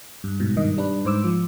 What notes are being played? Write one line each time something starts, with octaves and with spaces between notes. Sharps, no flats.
G2
G#2 B2
G2 D#3 D#5
G3 D4 B4
G#2 C5 D6 E6
F3